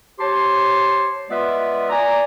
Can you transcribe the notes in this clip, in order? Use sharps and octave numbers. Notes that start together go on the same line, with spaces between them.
G4 C5 C#5 A5 C6
G#3 B3 F4 B4 D5 E5
D5 G#5 A#5